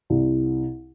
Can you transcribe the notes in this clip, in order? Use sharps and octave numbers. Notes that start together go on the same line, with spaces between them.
C2